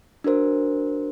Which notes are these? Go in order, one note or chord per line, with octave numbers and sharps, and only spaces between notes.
D4 F#4 A#4 C5